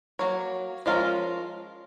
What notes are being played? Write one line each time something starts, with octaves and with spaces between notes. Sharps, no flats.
F#3 A#3 C#5
F3 G#3 C#4 F4 A#4